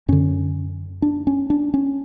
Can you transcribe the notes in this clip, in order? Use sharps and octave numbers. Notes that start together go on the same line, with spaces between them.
F#2 D3 C#4
D4
C#4
D4
C#4